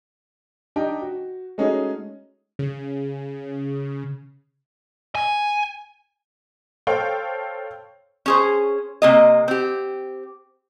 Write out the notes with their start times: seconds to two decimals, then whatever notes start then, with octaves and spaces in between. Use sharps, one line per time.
0.76 D4 D#4 G4 G5
1.02 F#4
1.58 G#3 A3 C#4 D#4 F#4 G#4
2.59 C#3
5.15 G#5
6.87 A4 C5 C#5 F5 G5
8.26 C#4 G#4 C5
9.02 C3 A#3 D#5
9.48 C4 G4